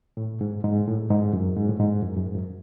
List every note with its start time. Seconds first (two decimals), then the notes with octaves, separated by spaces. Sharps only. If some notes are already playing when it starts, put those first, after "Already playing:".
0.17 A2
0.41 G#2
0.64 G#2
0.87 A2
1.10 G#2
1.33 F#2
1.56 G#2
1.69 A2
1.79 G#2
2.02 F#2
2.17 F#2
2.26 G#2
2.35 F#2